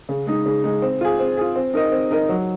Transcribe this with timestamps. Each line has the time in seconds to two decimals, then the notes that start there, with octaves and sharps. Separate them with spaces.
0.09 C#3
0.27 G#3 D#4
0.46 C#3
0.64 G#3 D#4
0.82 C4
1.01 F4 G#4
1.19 C4
1.37 F4 G#4
1.56 C4
1.74 D#4 A#4 D#5
1.92 C4
2.11 D#4 A#4 D#5
2.29 F#3